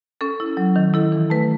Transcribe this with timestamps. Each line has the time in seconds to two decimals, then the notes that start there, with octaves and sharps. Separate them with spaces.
0.21 C#4 A4
0.40 E4
0.57 F#3
0.76 D#3
0.94 E4 A4
1.12 E3
1.30 A3 B4